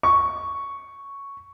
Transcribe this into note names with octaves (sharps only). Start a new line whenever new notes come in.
C#6